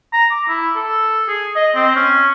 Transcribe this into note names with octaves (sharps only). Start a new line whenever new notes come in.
A#5
D6
E4
A4
G#4
D#5
C4
C#4